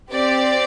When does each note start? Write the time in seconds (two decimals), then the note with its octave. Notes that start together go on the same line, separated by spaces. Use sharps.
0.12 C4 G4 D5